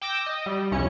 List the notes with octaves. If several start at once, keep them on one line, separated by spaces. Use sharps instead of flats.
G5 D6 E6 G6 A#6
D#5
G3
C2 F2 C#4 C#7